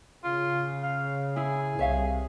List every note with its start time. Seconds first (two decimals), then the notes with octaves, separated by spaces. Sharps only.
0.24 C#3 F4
0.83 F5
1.36 E4 G#4
1.79 C2 C#5 E5 F5